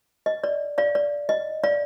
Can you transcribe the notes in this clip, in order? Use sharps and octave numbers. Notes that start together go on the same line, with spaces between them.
D#5
D5
D5 F5
D5
D#5
D5 F5